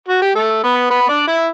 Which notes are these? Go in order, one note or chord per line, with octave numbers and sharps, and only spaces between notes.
F#4
G4
A3 A4
B3 B4
B3 B4
D4 D5
E4 E5